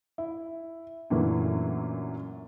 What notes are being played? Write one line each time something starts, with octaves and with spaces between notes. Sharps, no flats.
E4
F#2 A#2 D3 E3 A3